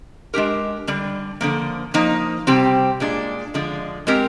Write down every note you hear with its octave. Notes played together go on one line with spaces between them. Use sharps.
G#3 D4 G4 A#4
D3 G3 D4
D3 F3 A#3
F3 A#3 D#4
C3 G3 C4 G4
A#2 G#3 D4
D3 F3 G#3 D4
G#3 C4 G4 A#4